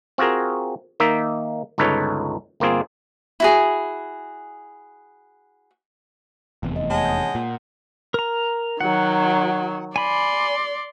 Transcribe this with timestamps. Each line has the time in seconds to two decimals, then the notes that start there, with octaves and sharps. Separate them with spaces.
0.18 C4 F4 F#4 G#4 A#4
1.00 D#3 A#3 D#4 E5
1.78 G1 C#2 D#4 A4 B4 C#5
2.60 G1 A#3 C4 F4 G#4
3.40 E4 F#4 G#4
6.63 F1 E2
6.76 A3 D#5
6.90 G#3 C#5 F#5 A5
7.05 F#5 D#6 G6
7.35 A#2
8.14 A#4 A#5
8.81 D#3 F#3 F#5
9.96 D5 G#5 B5 C6